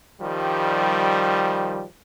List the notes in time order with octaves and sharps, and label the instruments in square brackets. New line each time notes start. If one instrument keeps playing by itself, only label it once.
[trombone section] D#3 F3 G3